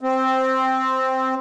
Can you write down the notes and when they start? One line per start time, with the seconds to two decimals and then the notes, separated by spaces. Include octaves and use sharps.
0.01 C4